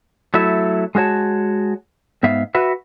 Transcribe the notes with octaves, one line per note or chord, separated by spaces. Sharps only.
F#3 A3 E4 E5
G#3 F4 F#4 C#5 A5
G#2 B3 E5 F5
F#4 B4 E5